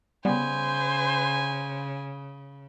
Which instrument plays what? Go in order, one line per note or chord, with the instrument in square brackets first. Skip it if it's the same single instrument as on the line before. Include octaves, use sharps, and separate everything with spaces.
[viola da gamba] C#3 [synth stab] G3 B3 [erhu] C5 [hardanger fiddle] G#5